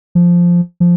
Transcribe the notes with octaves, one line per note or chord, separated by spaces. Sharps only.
F3
F3